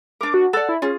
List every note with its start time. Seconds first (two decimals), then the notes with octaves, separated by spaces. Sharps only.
0.21 D4 A#4 D6
0.34 F#4
0.53 A4 D5 F#5
0.69 E4
0.82 C#4 F4 G#4